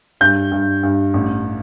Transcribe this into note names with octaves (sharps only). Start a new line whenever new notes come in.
G2 G6
G2
G2
A1